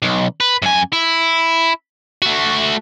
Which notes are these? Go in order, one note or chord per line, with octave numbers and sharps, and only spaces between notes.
B1
B4
F#2 G#5
E4
A3 F#4